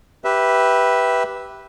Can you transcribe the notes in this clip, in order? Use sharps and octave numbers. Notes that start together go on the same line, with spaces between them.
G4 B4 E5